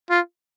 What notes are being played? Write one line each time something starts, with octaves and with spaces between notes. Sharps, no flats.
F4